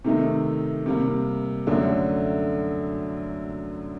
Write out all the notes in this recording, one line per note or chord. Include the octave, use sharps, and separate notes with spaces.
C3 D#3 A3 D#4
C3 G3 A#3
F#2 D3 F#3 A3 D4